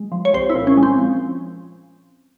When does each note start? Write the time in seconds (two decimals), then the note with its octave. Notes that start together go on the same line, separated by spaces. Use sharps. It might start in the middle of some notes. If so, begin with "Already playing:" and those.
Already playing: G#3
0.12 F3
0.25 C#5
0.34 C2 C5
0.50 E4
0.55 A#2
0.67 C#4
0.77 G#3
0.83 C4
0.99 F3